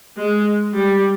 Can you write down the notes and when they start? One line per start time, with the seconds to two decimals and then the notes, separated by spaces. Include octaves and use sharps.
0.17 G#3
0.73 G3